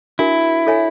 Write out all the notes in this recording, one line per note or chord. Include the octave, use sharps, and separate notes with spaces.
D4 E4 F#4 A#4
A4 C#5 E5 G#5